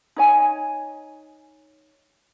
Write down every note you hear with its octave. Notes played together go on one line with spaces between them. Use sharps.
D#4 C#5 G#5